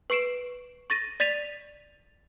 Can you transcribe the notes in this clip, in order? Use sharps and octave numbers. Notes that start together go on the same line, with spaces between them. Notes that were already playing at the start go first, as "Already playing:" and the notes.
B4 C#6 C7 D7 E7
C#6 A6 A#6 D#7
D5 A6 B6 D#7 F7